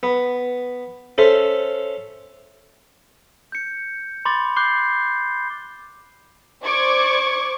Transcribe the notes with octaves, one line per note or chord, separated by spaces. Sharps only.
B3
C#4 A4 C5 E5
G6 C#7
B5 C6 D6 A6
C6 D6 F#6 G6 C7 G7
C5 D5 C#6 D6 G#6